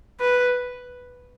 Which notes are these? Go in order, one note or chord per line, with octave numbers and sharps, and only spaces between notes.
B4